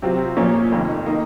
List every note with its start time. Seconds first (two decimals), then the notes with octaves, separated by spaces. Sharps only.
0.02 C3 F#3 C4 F4
0.37 A#2 F3 A#3 C#4
0.71 F1 F2 D#3
1.06 D#3 A#3 D#4